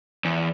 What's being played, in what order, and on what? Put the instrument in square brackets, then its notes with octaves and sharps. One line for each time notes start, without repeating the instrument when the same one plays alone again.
[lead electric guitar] E2